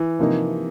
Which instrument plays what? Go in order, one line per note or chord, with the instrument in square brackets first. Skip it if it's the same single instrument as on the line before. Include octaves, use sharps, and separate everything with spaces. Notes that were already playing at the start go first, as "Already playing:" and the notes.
Already playing: [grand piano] E3
[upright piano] C3 F3 A#3 D#4